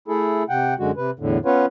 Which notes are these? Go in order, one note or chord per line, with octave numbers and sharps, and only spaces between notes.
A3 E4 G#4 A4
C3 F#5 G5
F#2 D3 G#3 F#4
C3 B4
E2 A2 D3
B3 C#4 F4 B4 C#5